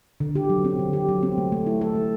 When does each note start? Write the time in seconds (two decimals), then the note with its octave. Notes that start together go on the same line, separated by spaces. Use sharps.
0.20 D3
0.35 G4
0.50 F#3
0.65 C4
0.79 D3
0.93 G4
1.09 F#3
1.23 C4
1.38 A3
1.52 A3
1.67 E4
1.81 A4
1.95 A3